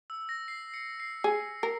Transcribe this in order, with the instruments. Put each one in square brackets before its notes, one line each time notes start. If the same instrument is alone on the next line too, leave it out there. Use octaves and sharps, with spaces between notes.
[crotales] E6
A#6
C7
C#7
C7
[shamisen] G#4
A#4